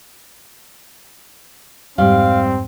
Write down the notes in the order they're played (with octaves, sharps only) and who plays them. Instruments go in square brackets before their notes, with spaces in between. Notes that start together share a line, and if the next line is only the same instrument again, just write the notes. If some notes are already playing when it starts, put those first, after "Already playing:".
[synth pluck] F2 G#2 [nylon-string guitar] G3 [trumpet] C4 [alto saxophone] F5